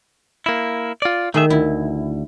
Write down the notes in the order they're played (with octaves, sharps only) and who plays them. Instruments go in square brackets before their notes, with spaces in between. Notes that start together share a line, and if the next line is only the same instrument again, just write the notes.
[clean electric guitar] A#3 E4
F4 D5
[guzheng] D#3 [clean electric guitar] A3 G#4 E5
[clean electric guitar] D2 [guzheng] E4